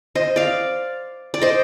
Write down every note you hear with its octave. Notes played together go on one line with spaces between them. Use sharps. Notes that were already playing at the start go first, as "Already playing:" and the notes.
C5 D#5
D5 F5
D5
C5 D#5